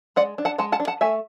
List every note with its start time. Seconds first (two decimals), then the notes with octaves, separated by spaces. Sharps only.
0.16 G#3 D5 F#5
0.38 D4
0.45 F#5 A5
0.58 G#3 F#5 A5
0.72 F#5 A5
0.80 D4
0.87 F#5 A5
1.01 A3 E5 G#5